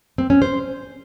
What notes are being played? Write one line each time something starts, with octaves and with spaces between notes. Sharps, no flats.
C4
C#4
C5